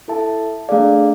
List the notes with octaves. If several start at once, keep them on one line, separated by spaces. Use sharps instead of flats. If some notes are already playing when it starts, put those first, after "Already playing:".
E4 A4 E5 A5
A3 D4 G#4 D5 F5